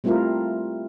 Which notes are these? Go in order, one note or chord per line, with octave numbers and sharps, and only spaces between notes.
G3 A3 C4 E4 F4 A#4